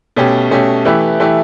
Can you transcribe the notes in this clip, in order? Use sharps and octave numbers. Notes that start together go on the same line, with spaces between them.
B2 A3 C#4 G4
B2 A3 C#4 G4
E3 A3 E4 G4
E3 A3 E4 G4